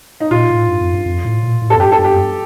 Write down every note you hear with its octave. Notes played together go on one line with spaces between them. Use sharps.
D#4
A#2 F4
A2
G2
F2
G2
F2
A2
A#2
A2
F2 A4
G2 G4
A4
G2
G4
F2
G2